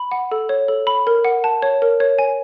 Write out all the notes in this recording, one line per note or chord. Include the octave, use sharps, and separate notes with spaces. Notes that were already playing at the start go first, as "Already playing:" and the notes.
Already playing: B5
F#5
A4
C#5
A4
B5
A#4
F#5
A5
C#5
A#4
C#5
G#5